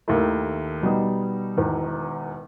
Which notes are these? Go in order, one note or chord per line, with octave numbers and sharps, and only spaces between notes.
D#2 D#3 A3 E4
B2 G3 B3 D#4
E1 E2 D#3